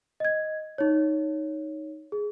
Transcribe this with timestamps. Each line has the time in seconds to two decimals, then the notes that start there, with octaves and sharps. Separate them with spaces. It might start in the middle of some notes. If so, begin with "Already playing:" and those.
0.20 D#5 G#6
0.78 D#4 C#5
2.12 G#4